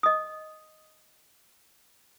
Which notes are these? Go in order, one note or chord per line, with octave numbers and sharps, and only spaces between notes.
D#5 D#6